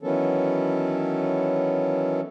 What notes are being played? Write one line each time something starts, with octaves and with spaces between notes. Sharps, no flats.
D#3 E3 F#3 B3 C#4 A4